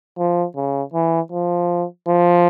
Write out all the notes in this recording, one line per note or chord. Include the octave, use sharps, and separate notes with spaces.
F3
C#3
E3
F3
F3